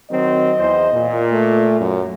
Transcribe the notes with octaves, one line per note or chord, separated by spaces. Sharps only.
D#3 F#3 C4 D#5
E2 C5
A#2
A3
F#2